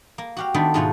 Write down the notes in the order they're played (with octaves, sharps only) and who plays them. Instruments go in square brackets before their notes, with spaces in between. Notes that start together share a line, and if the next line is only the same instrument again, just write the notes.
[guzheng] A#3
F#4 G4 F5
D#3 A3 B3 D4 C5 G5
G#2 B2 A3 F4 C5 F#5